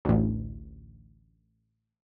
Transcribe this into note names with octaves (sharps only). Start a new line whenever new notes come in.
A1 D2